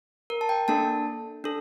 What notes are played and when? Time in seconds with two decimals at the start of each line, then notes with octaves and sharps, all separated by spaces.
0.30 A#4
0.41 A5
0.49 G5
0.68 A#3 D4 A4 A5
1.44 D4 A4